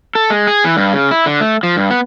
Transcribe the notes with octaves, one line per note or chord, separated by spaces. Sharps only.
A4
G#3
G#4
E3
G2
C#3
E4
D3
A3
F3
G2
B3